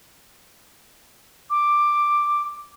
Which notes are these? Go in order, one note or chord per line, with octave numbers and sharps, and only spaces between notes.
D6